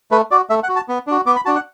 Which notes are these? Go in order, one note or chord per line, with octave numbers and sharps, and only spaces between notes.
A3 B4
F#4 D5
A3 E5
F#5
F#4
A5
B3
D4 F#4
B3 D6
B5
D4 F#4 A5
F#5